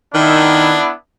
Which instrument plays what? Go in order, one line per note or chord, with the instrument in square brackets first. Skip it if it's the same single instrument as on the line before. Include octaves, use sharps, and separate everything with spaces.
[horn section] D#3 [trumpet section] B3 D4 E4